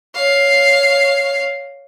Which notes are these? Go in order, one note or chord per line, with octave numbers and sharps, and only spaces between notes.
C#5 F5